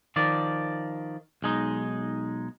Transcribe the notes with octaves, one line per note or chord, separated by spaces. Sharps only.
D#3 F3 D5
B1 G#3 D#4